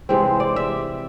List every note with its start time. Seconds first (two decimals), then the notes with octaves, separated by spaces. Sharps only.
0.09 C3 E3 G#3 C4
0.40 D5
0.56 E5